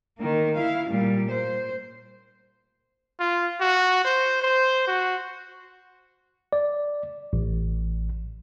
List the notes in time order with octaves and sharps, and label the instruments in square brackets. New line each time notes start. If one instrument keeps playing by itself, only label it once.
[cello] D#3 A#3
E4 F5
A#2 G3
C5
[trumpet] F4
F#4
C5
C5
F#4
[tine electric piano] D5
A1